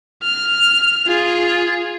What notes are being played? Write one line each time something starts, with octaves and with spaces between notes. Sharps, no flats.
F6
F4 G#4